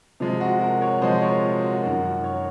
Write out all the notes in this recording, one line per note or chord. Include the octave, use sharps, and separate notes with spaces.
C3 F3 G#3 F4
F#4
F#4 A#4
A#4 C#5
C3 F3 G#3 C5 D#5
A#4 C#5
F4
F#4
F#2 D#3 F#3 F#4 A#4
A#4 C#5